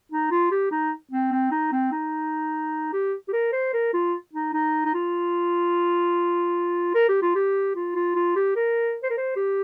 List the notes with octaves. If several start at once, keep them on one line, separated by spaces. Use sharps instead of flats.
D#4
F4
G4
D#4
C4
C4
D#4
C4
D#4
G4
G4
A#4
C5
A#4
F4
D#4
D#4
D#4
F4
A#4
G4
F4
G4
F4
F4
F4
G4
A#4
C5
A#4
C5
G4